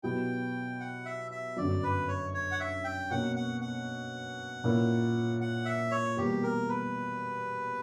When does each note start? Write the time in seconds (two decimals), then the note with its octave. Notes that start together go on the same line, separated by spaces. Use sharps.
0.03 B2 F#3 B3 E4 G4 G5
0.80 F#5
1.06 E5
1.31 E5
1.56 G1 F#2 D3 F#3 D5
1.83 B4
2.08 C#5
2.34 C#5
2.51 F#5
2.60 E5
2.84 G5
3.10 B2 A#3 C#4 F#5
3.36 F#5
3.61 F#5
4.64 A#2 A#3 C#4 E4 A#4
5.41 F#5
5.65 E5
5.92 C#5
6.17 E2 B2 G3 A#3 G4
6.43 A#4
6.69 B4